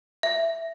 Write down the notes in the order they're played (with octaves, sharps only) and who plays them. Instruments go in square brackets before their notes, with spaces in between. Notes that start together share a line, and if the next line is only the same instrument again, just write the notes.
[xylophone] E5